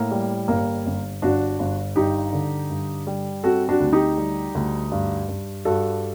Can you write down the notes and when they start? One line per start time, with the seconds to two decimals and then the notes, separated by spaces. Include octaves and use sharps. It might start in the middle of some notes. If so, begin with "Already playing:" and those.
Already playing: A2 A#3
0.11 G3
0.48 G1 A#3
0.86 G1
1.22 G1 D4 F#4
1.59 G1
1.96 G2 D#4 G4
2.33 D3
2.70 G2
3.07 G3
3.44 C4 F#4 A4
3.69 D4 F#4
3.80 D2
3.93 D#4 G4
4.17 G3
4.55 D2
4.92 G2
5.29 G2
5.65 G2 F#4 A4